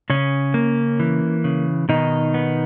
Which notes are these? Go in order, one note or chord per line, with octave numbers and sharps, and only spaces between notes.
C#3 C#4
A#3
E3
C#3
B2 D#3 D#4
B3